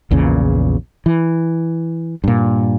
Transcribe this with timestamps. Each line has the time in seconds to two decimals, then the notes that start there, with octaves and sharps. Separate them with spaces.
0.11 A#1 E2 A#2 C#3
1.06 E3
2.24 G2 A#2